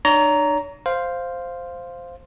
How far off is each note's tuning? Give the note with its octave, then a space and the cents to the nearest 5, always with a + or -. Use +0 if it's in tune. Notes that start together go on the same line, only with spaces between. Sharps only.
D4 +45 C#5 +40 A#5 +0
C5 +0 F5 +0